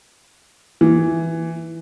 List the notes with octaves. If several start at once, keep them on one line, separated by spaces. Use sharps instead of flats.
E3